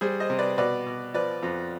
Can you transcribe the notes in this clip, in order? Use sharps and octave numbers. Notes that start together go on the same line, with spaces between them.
G3 G#4 C5
C5 D#5
C3
B4 D5
B2 B4 D5
B2
F3 B4 D5
F2